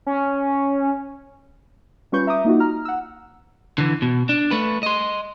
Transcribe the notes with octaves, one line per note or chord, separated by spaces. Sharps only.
C#4
G3 C#4 F4 B4 C#6 G6
E5 A#5 D6 D#6
A#3 D#4 F4 F#4
A#5 F6
F#5 E6
D3 E3
B2
D4
A3 B4
D#5 C6